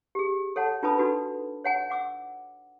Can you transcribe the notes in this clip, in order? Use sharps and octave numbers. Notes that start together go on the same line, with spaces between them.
G4 G#4
A4 C#5 F#5 A5
D4 F4 B4 A5 B5 D#6
D4 D#4 F#4 A4 B4 B5
C#5 F#5 G#5
F#5 D6 E6